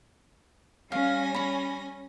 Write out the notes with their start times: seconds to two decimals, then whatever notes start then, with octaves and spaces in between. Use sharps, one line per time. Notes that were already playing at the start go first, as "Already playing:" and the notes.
0.92 G3 C#4 F5 G#5 A#6
1.34 C#4 C#5 B5